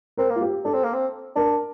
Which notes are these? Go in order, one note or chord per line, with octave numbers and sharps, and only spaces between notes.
C4 A#4
A#3
F4
G4
D4 A4
C4
A#3
C4
D4 A#4